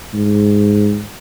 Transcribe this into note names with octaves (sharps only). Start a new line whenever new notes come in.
G#2